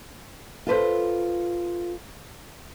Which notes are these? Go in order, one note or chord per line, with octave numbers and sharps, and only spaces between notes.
F4 A4 B4 C5